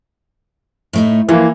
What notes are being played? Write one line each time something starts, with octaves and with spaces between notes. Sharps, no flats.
A2 A3 D#4
E3 F3 A#3